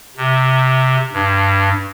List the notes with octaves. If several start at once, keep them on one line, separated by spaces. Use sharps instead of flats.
C3
G2